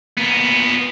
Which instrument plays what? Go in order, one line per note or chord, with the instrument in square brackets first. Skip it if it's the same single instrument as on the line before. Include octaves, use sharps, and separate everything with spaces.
[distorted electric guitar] A#2 B3